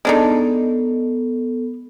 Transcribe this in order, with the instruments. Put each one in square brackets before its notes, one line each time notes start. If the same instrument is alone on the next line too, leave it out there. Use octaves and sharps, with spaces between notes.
[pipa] G#3 D4 D#4 [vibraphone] B3 A4